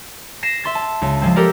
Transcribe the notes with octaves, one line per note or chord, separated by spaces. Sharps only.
A#6 C7 E7
E5 C6 A6
A5
C#2
F3 G#3 C4
G4 A4 A#4 D5